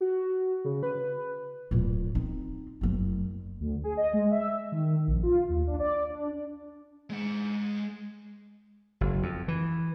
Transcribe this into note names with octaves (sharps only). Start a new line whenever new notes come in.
F#4
C#3
B4
D1 A#2
C4 D#4
F#1 A3
D2
G#4
D#5
G#3
E5
D#3
A#1
F4
D#2
D4
D5
D4
G#3 F#5
F#1
F2
E3